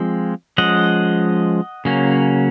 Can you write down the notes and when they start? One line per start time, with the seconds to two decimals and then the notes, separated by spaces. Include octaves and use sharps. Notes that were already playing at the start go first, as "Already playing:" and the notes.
Already playing: F3 G#3 C4
0.58 F3 G#3 C#4 D#5 F#5
1.85 C#3 F#3 A#3 C#4